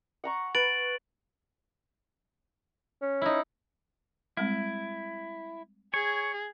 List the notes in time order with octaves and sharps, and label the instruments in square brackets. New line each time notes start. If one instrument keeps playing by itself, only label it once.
[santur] F#5 A#5 C#6
[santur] B4 [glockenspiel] A6 D7 F#7
[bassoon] C#4
[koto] D#4 E4
[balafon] G3 G#3 C4 [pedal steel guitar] E4
[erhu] G#4 [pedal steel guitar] C#5